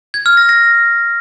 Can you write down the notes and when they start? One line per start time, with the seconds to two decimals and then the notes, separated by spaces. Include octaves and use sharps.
0.14 G#6
0.26 F6
0.37 A#6
0.49 A#6